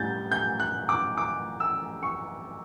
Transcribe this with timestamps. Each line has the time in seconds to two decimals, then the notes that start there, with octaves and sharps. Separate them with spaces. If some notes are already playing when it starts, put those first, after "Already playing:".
Already playing: A2 G3 G6 A6
0.31 G6
0.60 F#6
0.89 D6
1.17 D6
1.60 E6
2.03 C#6